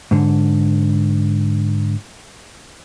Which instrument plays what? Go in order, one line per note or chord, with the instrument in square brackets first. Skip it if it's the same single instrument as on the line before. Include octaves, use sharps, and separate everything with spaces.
[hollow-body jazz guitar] G#2 D3